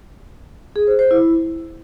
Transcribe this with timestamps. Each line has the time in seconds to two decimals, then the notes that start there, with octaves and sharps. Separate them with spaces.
0.76 G#4
0.87 C5
0.99 C5
1.11 E4